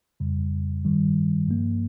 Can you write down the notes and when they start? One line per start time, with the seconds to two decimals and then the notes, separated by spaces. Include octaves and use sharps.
0.20 F2 C#3 G3
0.85 G2 D#3 G3
1.48 G2 F3 A#3